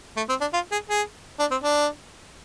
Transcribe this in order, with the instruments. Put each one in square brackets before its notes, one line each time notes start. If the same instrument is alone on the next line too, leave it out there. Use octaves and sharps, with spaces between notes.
[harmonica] A3
C4
D4
F4
G#4
G#4
D4
C4
D4